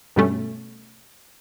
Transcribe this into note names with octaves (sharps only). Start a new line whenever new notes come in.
G2 B2 G3 A3 C#4